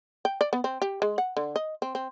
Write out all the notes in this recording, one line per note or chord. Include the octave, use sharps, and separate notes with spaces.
G5
D5
B3
C4
G4
G#3
F#5
D3
D#5
C4
C4